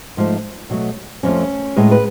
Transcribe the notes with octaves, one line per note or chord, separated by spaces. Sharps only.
G#2 F3 A3
B2 F#3 A3
F2 F3 A3 C#4
A2 G#3 B4
B4